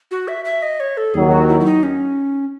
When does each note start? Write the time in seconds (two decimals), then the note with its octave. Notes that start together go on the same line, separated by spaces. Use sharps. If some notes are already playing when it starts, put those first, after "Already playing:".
0.11 F#4
0.28 E5
0.45 E5
0.62 D#5
0.80 C#5
0.97 A4
1.14 D#2 D#3 F#3 G#4
1.31 F#4
1.49 E4
1.60 E4
1.65 D#4
1.83 C#4